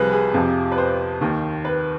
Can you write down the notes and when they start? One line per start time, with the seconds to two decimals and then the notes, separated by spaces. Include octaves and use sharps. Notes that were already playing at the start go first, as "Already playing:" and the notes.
Already playing: C2 C3 F3 G#4 B4 C5
0.12 G#4
0.34 F2 C3 F3
0.72 B4
0.78 C5
1.21 D#2 D#3
1.65 B4